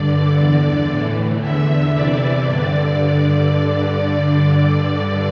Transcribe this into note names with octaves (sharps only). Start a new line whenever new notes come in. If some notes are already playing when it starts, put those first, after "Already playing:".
Already playing: G2 D3 D5
E2 D3
A2 E3
E2 D3 E5
E2 C3 E3 D5
G2 D3 D5